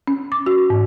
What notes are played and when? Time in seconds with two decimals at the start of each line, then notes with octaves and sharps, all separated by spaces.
0.07 C#4
0.32 D6
0.46 F#4
0.70 G#2